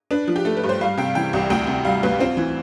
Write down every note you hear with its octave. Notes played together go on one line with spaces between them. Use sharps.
D4 B4
F3
G4
A3 A4
B4
G2
C5
G3 F5
C3 G5
E3 G5
C2
D2 G5
C3
G3 F5
D2 B4
C4 F4
E3